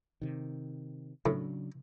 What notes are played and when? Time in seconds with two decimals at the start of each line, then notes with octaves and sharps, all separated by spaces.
0.22 C3 D#3
1.26 A2 C#3 F#3 D4